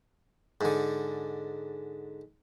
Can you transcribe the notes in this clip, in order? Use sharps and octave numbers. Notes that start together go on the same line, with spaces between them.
G#2 D3